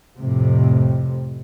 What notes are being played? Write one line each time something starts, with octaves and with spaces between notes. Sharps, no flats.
F2 A2 C3